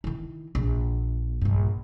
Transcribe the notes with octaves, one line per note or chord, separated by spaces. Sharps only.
D#3 E4
A#1
A#1 G2